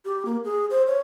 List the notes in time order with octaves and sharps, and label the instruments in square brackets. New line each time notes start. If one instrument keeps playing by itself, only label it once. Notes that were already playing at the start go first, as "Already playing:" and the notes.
[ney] G4
A#3
G#4
C5
C#5